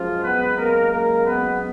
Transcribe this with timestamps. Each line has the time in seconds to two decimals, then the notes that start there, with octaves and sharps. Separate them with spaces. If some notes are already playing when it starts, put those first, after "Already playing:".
Already playing: F#2 F3 G#3 F4
0.24 B3 B4
0.58 A#3 A#4
0.91 A#3 A#4
1.25 B3 B4